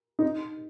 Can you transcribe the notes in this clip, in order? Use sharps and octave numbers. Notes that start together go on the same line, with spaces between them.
D#4